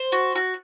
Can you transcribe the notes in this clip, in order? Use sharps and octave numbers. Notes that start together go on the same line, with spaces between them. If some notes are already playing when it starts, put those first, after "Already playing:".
Already playing: C5
F#4
F#4